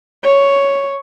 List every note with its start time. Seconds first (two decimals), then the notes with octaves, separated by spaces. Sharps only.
0.24 C#5